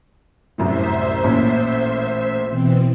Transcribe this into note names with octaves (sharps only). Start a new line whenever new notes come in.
C2 F#2 A2 C5 E5
A1 A#2 C#4
B2 E3 C4